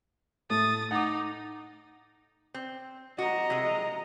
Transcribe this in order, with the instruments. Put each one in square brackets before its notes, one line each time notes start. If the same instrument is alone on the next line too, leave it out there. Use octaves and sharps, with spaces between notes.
[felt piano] A2 A3 [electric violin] D#6 A6
[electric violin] D#4 [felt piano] F#5 D6
[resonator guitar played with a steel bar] C4
[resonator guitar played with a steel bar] F#4 [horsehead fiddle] D#5 A#5
[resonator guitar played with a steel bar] C3 G#3